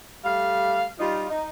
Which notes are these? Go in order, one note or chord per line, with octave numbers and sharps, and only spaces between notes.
G3 A3 F5
G3 D#4 F4
D#4